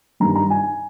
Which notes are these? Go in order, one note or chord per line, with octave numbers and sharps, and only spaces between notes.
G2 D#3 G3 A#5
A#5
G#5